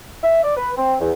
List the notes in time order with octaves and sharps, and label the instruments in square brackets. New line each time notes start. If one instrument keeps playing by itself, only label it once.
[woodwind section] E5
D5
B4
C4
E2